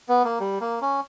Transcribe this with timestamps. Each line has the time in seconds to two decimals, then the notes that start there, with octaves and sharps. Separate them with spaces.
0.09 B3
0.25 A#3
0.40 G3
0.61 A#3
0.82 C#4